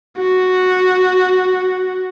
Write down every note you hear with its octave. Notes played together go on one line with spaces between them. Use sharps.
F#4